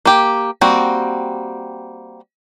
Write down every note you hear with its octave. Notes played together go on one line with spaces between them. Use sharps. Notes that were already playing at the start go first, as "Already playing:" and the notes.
A#3 G4
G3 A#3 C4 F#4